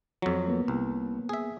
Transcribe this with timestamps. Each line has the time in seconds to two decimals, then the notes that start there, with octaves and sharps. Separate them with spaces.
0.22 F2 F#3 F4
0.48 A#3 B3
0.68 C2
1.29 G#4 E5